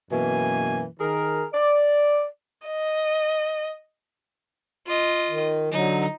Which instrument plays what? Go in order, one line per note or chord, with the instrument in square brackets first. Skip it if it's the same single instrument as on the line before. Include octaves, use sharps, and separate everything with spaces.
[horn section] F#2 B2 E3 A#3 G#5
D#3 G#4 A#4
D5
[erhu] D#5
[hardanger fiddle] F4 D#5
[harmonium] D#3
[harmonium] D3 F#3 [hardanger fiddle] D#4